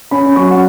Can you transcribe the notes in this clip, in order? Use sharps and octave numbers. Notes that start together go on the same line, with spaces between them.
C#4 B5
F#3 C#6
F#5